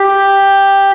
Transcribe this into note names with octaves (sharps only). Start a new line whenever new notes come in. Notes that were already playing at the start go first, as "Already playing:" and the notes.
Already playing: G4